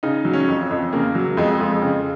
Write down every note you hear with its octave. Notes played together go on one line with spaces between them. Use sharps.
C#3 D#4
F#3
C#4
F2
F2
C#3 A#3
F#3
F2 G#3
F2
C#3